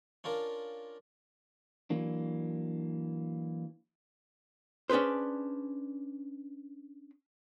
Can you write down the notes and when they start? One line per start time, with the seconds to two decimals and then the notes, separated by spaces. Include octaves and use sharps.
0.24 C#4 D4 F4 A#4
1.90 E3 F#3 A#3 D4
4.90 C#4 D4 G#4 B4 C5